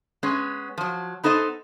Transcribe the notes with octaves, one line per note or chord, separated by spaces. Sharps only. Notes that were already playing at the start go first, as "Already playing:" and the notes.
G#3 B3 C#4
F3 F#3
B3 D#4 A4 C5 D#5